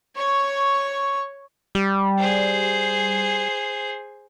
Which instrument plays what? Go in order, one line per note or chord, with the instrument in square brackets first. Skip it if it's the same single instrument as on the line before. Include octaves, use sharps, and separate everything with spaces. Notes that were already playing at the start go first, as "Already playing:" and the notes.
[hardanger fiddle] C#5 C#6
[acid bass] G3
[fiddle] G#4 C5